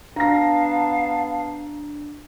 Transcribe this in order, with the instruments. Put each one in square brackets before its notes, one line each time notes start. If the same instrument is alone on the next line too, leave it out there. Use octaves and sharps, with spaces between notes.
[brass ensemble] B3 A5 [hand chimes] D4 [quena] F5 [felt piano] A#5 A#6